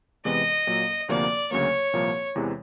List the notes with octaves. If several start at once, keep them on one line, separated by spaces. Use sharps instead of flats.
E2 C3 E3 G#3 B3 D#5
A#2 F#3 A#3
D2 C3 F3 A#3 D5
D2 C#3 F#3 A#3 C#5
C2 A#2 F3 A#3
E2 C3 E3 G#3